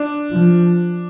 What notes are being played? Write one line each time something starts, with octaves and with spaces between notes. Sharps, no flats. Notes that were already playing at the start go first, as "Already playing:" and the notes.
Already playing: D4
F3